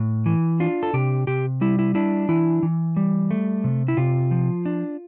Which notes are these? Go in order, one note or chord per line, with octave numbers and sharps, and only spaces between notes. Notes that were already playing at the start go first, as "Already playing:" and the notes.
Already playing: A2
E3
D4 F4
A4
C3 G4
C3 G4
G3 E4
E4
D4 E4
E3 E4
E3
G3
A3
C3
E4
C3 F4
F3
D4